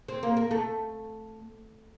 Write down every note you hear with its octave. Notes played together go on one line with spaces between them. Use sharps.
C4
A#3
A#3
A3